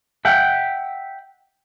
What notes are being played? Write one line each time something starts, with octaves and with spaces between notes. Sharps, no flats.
E5 F#5 G5